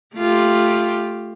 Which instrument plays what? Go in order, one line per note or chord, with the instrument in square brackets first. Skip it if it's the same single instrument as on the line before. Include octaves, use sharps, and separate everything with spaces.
[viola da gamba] A3 F4 G4